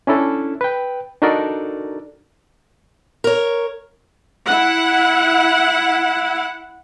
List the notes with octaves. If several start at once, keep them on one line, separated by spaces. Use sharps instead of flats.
C#4 D4 E4 A4
B4 G5
D4 D#4 F#4 A4 A#4 D5
A#4 C#5
E4 F#5